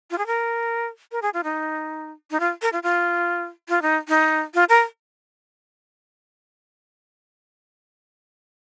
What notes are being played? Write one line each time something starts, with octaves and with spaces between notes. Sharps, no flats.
F4
G#4
A#4
A#4
G#4
F4
D#4
D#4
F4
A#4
F4
F4
F4
D#4
D#4
F4
A#4